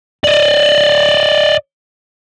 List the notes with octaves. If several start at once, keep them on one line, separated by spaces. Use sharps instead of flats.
D5 D#5